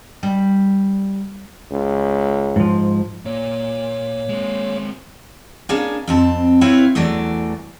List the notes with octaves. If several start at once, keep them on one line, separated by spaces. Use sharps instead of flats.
G3
C#2
G#2 F3
A#2 A#3 C#5
G#3 C4
A#3 C#4 D4 G#4 F5
F2 C4 A5
C4 E4 B4 C#5 E5 F5
E2 E3 F#3 A3 D5